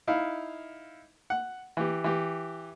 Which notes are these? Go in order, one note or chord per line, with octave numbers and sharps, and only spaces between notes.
D#4 E4 F5
F#5
E3 G4
E3 G4